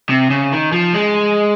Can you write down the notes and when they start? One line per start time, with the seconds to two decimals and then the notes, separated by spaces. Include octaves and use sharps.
0.09 C3
0.30 C#3
0.52 D#3
0.72 F3
0.93 G#3